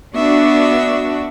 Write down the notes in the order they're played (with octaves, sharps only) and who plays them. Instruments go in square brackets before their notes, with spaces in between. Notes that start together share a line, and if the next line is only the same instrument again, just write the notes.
[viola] B3 E5 [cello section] D4 F#4